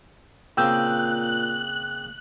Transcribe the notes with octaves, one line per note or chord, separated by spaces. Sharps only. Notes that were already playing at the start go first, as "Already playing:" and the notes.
A#2 C#3 A#3 C4 G5 E6 F#6 G6